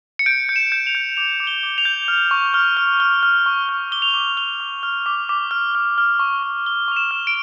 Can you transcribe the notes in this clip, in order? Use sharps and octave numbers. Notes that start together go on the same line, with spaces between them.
C#7
G6 D7
G6
E7
G6
F7
G6
D6 F7
D6
G7
D6
F7
G6
F6
C#6
F6
F6
F6
F6
C#6
F6
D6 G7
F7
G7
D6
F6 G7
D6
F6
D6
D6
F6
F6
F6
C#6
C#6
C#6 G7
C#6 F7
E7
F6
D7